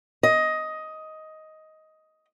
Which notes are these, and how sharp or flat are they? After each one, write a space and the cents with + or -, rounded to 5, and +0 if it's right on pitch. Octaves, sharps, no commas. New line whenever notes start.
D#5 +10